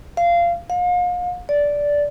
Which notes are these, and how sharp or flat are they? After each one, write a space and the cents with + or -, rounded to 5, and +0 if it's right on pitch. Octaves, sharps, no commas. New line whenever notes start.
F5 -20
F5 +40
D5 -10